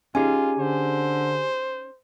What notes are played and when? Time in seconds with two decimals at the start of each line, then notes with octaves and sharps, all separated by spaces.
0.15 C#4 D#4 F4 G4 G#4 G#5
0.59 D3 C5